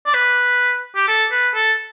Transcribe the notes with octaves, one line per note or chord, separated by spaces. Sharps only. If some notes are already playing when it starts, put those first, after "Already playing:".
D5
B4
G4
A4
B4
A4